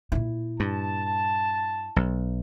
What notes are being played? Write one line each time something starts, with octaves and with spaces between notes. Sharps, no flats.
A#2 E4
G2 A5
B1